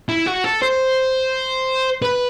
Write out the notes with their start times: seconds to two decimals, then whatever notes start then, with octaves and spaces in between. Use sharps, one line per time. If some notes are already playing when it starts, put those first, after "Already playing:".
0.09 E4
0.26 F#4
0.44 A4
0.62 C5
2.02 B4